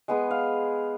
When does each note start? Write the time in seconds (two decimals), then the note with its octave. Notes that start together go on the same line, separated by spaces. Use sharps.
0.08 G#3 B3 G#4
0.31 F5